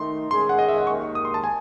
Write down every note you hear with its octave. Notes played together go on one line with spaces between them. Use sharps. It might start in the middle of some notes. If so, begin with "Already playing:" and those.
Already playing: D#3 A3 D#4 C6
D#3 G#3 C#4 G#4 C6
F#5
D#5
E5
F#5
D#2 D#3 G#3 C#6
D#6
C6
A5
G#5